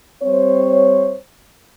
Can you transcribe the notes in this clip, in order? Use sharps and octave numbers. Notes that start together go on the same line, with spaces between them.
G3 C4 C5 C#5